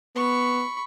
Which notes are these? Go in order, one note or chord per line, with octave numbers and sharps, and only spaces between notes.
B3 B5 C#6